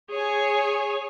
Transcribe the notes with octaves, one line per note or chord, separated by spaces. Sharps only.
G#4 C#5 G#5